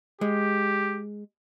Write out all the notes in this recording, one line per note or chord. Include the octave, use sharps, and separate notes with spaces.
G#3 G4